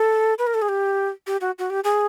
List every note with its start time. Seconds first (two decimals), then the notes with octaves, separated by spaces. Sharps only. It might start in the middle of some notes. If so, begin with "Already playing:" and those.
Already playing: A4
0.39 B4
0.47 A#4
0.54 A4
0.62 G#4
0.69 G4
1.27 G4
1.41 F#4
1.59 F#4
1.70 G4
1.84 G#4